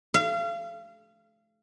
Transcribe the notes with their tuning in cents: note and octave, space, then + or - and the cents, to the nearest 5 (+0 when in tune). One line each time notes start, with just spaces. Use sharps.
F5 -35